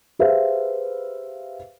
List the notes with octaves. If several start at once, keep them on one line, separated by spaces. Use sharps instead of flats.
G4 G#4 B4 C5 E5 F5